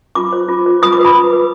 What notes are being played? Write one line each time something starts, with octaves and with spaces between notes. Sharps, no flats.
F4 D6
C5
F4
C5
F4 D#6
D6
B4
B5
F4
B4